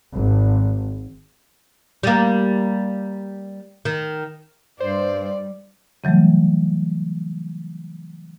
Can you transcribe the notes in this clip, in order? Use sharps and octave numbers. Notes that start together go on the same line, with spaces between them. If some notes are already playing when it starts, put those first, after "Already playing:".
G#1
G3 A#3
D#3
G2 G3 C5 D5
C#3 E3 F#3 G3 A3